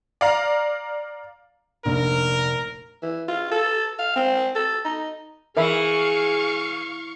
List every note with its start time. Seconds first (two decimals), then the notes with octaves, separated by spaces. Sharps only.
0.21 D5 F5 A#5
1.85 F1 A#1 A#4
3.02 E3
3.28 F4
3.51 A4
3.99 F5
4.16 C4
4.56 A4
4.85 D#4
5.57 E3 G#4 A#4 E5 F5 B5 C#6